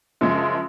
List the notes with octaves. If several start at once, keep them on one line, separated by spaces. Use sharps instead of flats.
F#2 C#3 F3 G#3